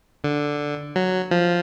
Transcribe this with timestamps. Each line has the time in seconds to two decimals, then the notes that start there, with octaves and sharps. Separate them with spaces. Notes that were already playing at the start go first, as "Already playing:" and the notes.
0.24 D3
0.96 F#3
1.31 F3